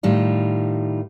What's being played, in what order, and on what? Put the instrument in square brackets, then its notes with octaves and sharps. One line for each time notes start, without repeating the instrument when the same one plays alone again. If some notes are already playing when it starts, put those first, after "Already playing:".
[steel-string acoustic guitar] A2 D#3 G3 F4